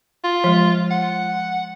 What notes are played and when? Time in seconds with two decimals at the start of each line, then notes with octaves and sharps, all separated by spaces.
0.24 F4
0.44 F3 G#3
0.90 F#5